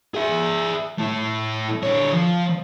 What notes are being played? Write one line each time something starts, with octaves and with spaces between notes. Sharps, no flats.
G#4 E5
A3 E4
D3 C#5
F3